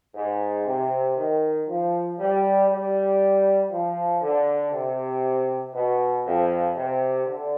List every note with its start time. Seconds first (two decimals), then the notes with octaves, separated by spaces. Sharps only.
0.15 G#2
0.66 C3
1.16 D#3
1.67 F3
2.18 G3
2.69 G3
3.71 F3
4.22 D3
4.72 C3
5.74 B2
6.25 F2
6.75 C3
7.26 D3